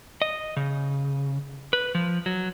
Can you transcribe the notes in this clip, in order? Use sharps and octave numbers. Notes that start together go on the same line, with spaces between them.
D#5
C#3
B4
F3
F#3